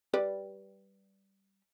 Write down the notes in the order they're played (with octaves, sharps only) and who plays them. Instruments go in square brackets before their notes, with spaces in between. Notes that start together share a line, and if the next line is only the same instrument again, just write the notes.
[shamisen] G3 B4 D5